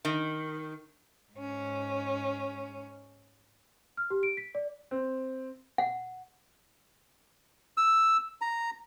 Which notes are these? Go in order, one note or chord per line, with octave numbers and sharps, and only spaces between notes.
D#3
G#2 C#4
F6
G4
D7
B6
D5
C4
F#5
E6
A#5